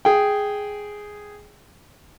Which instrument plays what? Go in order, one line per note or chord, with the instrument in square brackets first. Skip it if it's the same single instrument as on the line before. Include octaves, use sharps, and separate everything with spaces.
[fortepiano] G#4 G5